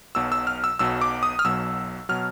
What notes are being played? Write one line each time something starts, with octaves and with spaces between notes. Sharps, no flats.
B1 B2 F#3 E6
E6
F6
E6
B1 B2 F#3 E6
D6
D#6
F6
B1 B2 F#3 E6
B2 F#3 F6